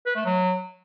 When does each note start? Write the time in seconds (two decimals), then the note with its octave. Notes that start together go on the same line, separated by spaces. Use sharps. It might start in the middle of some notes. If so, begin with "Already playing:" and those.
0.06 B4
0.16 A3
0.25 F#3